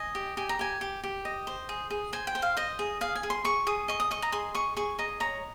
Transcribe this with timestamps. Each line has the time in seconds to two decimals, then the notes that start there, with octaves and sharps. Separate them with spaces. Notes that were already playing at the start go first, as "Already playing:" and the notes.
Already playing: D#5 G#5
0.15 G4
0.37 G4 G#5
0.49 A#5
0.59 G4 G#5
0.81 G4
1.04 G4
1.25 D#5
1.47 C5
1.69 G#4
1.90 G#4
2.13 C5 G#5
2.27 G5
2.35 C5
2.42 F5
2.57 C5 D#5
2.79 G#4
3.01 G#4 F5
3.15 G#5
3.23 G#4
3.30 C6
3.45 G#4 C#6
3.67 G#4 D#6
3.88 D#5 C#6
4.00 D#6
4.11 D#5 C#6
4.22 A#5
4.32 G#4 C6
4.55 G#4 C#6
4.77 G#4 C#6
4.99 D#5 A#5
5.20 C#5 A#5